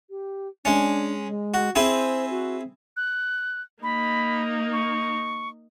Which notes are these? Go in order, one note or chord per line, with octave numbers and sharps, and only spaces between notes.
G4
G#3 C#4 D4
G#3
F#4
C4 E4 G#4 C5
F#4
F#6
A#3 D#4 B5
C#6